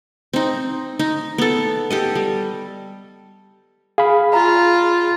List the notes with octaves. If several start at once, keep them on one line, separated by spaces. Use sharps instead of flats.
C4 D#4
D#4
B3 A4
G4 A4 D#5
G3
G#4 F5 B5
F4 A#5